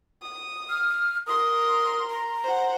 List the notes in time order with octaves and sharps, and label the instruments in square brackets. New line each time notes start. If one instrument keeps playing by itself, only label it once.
[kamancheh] D#6
[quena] F6
[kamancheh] A#4 C6 [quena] D#6
[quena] A#5
[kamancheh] C5 F#5